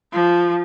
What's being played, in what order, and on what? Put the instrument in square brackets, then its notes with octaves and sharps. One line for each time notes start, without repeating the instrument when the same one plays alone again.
[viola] F3